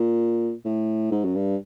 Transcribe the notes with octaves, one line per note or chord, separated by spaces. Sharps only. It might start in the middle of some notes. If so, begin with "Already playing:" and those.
Already playing: A#2
A2
G#2
F#2
G2